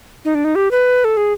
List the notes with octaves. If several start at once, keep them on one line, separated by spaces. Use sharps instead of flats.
D#4
D4
D#4
G4
B4
A4
G#4